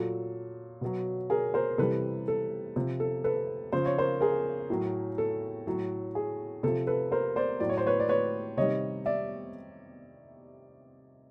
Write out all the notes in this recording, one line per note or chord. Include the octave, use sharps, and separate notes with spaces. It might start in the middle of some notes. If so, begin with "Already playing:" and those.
Already playing: A#2 F#3 A4
B2 F#3
G#4 A#4
A#4 C5
C3 E3 G3 A4 B4
A4
C3 F3
A4
A4 B4
C#3 F3 C5
C#5
A#4 C5
G#4 A#4
A2 F#3
A4
A2 F#3
G#4
C3 F3 A4
A4 B4
A#4 C5
C5 D5
A2 F#3 D5
C#5
C5
B4 C#5
D5
B4 C#5
C3 D#3 G3 C#5 D#5
D5 E5